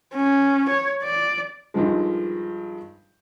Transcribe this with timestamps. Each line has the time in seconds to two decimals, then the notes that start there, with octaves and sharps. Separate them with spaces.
0.14 C#4
0.69 C#5
1.03 D5
1.74 G2 D#3 F3 G#3